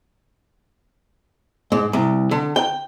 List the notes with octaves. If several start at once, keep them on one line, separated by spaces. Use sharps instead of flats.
G#2
C2
D3
G5